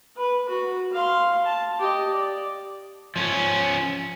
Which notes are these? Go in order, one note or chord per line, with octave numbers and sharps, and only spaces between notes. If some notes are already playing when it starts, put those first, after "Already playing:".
B4
F#4
F5 C6
A5
G4 D#5
D5
F3 C#4